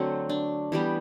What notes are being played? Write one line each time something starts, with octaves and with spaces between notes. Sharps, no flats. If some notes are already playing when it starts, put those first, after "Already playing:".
Already playing: D3 F#3 A3 C4
D4
E3 G3 B3 G4